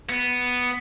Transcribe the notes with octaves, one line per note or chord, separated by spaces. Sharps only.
B3